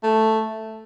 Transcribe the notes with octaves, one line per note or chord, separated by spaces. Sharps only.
A3